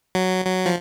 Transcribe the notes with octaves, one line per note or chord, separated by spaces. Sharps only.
F#3
F#3
F3